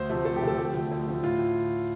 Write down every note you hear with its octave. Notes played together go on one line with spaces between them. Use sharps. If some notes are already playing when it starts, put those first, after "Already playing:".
Already playing: D2 C5
C3 F3 A3
D2 A4
G4
C3 F3 A3 A4
D2 G4
D3 F3 A3
D2
D3 F3 A3
A2 F4